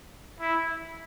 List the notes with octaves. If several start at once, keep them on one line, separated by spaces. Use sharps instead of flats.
E4